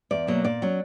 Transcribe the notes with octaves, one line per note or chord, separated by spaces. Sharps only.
E2 D5
B2 F#3 A#3
A#2 D5
F#3 C#4